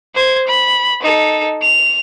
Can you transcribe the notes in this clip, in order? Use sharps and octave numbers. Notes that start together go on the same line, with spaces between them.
C5 G#6
B5
D#4 A4
F7